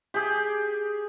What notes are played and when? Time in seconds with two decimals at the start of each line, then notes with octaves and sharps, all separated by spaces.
0.14 G4 G#4